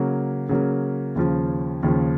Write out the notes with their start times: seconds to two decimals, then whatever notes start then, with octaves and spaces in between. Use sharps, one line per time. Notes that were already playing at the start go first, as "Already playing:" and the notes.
Already playing: C#3 F#3 A#3
0.49 C#3 F#3 A#3
1.16 D#2 C#3 F3
1.83 D#2 C#3 F3